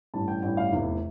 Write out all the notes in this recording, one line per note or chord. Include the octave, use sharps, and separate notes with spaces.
A1 G2 E3 A5
G5
A1 G2 E3 G5
F5
F1 E2 E3 E5